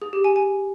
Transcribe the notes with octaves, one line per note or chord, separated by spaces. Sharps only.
G#4
G4
G#5
G#5